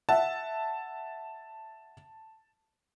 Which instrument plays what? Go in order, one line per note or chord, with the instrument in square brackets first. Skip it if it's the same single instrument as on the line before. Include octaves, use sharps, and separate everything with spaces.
[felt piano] E5 F#5 [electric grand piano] A5